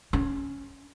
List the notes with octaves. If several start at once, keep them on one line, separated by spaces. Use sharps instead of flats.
C#4